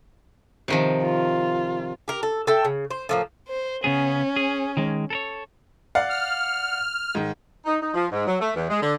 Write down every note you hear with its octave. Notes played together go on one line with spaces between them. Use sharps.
C3 D#3 F3
F4
G4 A#4
A4
A4 E5 G5
C#3
C5
A2 F3 A#3
C5
C#3 B3 C#4 G#4
G#4
D#3 G#3
A4 A#4 C#5
D5 F5 F#5
F6
G#2 D#3
D#4
D#4
F3
G#2
F#3
A3
E2
G#3
D3